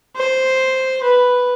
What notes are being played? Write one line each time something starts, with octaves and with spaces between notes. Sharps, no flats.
C5
B4